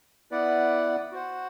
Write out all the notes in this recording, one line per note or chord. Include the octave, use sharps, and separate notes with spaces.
B3 E4 B4 D5 F#5
F#4 C5 F#5